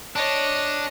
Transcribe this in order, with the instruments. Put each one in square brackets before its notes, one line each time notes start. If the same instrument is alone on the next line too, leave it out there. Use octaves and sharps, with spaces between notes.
[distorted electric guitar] D4 [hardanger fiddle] C#5 D#5